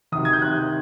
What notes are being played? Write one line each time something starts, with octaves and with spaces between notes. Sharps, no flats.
D2 C3 D#3 D#6
G#6
G6
D2 C3 D#3 F#6